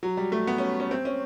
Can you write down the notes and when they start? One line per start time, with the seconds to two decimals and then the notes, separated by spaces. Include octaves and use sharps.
0.03 F#3
0.17 G3
0.32 A3
0.47 B3
0.58 C#4
0.80 C#4
0.91 C4
1.05 C#4